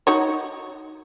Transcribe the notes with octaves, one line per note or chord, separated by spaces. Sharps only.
D#4 F#4 C#5